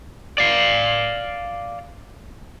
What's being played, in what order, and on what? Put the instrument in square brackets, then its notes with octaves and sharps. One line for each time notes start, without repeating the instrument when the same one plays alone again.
[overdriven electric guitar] D5 F5